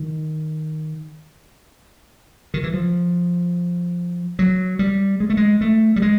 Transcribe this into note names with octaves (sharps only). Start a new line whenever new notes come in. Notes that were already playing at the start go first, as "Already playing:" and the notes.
Already playing: D#3
D#3
E3
F3
F#3
G3
G#3
A3
G#3
A3
G3
G#3